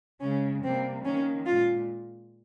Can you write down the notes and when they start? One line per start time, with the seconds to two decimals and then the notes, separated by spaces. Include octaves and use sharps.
0.21 C#3 G#3 C#4
0.63 C3 G3 A#3 C4
1.04 D#3 A#3 C#4
1.46 A#2 G#3 F4